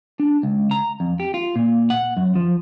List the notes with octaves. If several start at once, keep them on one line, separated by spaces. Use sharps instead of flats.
D4
C#2
A#5
F2
G4
F4
A#2
F#5
F#2
F3